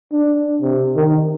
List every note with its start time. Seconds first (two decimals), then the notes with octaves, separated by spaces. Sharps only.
0.12 D4
0.62 C3
0.96 D#3